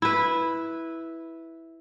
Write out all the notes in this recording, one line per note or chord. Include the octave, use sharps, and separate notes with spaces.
E4 B4